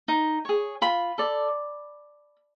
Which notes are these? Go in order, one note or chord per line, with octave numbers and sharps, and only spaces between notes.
D#4
G#4 C#5
F4 B5
A4 D5